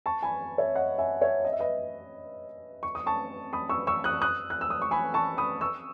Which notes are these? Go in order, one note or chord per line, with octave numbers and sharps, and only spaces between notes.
A5 C#6
G#5 B5
C#5 E5
D#5 F#5
E5 G#5
C#5 E5
D#5
E5
B4 D#5
C#6
D#6
A5 C#6
B5 D#6
C#6 E6
C#6 E6
D#6 F#6
D#6 F#6
F#6
E6
D#6
C#6
G#5 B5
A5 C#6
B5 D#6
C#6 E6